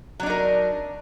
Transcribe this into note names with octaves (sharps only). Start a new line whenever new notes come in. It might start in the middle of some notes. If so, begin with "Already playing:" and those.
F#3 D4 D#4 A#4